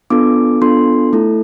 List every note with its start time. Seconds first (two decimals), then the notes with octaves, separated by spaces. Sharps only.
0.10 B3 D4 F4 A4 D6
0.61 B3 D4 F4 A4 C6
1.13 A3 E4 A4